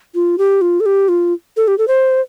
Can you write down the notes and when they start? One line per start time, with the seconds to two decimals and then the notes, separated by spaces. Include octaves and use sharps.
0.15 F4
0.38 G4
0.61 F4
0.80 A4
0.86 G4
1.08 F4
1.57 A4
1.68 G4
1.78 A4
1.88 C5